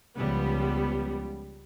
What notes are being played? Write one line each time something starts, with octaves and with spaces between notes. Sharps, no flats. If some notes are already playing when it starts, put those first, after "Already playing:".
C#2 F3 G3 B3